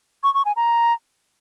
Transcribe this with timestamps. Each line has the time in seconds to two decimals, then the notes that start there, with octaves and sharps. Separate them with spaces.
0.23 C#6
0.34 C#6
0.45 G#5
0.56 A#5